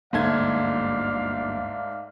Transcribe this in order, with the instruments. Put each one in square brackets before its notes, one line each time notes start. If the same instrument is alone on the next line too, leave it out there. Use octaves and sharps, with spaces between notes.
[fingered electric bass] G1 D2 A#3 [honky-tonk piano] G#2 A3 G#6 [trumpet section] D5 F5